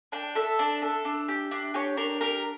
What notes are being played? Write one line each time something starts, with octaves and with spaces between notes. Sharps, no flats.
D4 G5
A4 E5
D4
A4
D4
G4
D4
G4 C#5
D4 A#4
G4 A#4